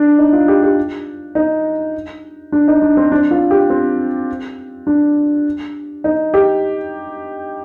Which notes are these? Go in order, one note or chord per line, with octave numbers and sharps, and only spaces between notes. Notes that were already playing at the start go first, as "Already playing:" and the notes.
Already playing: D4
D#4
F4
G4
G4
D#4
D4
D#4
D4
C4
D4
F4
G4
C4
D4
D#4
G4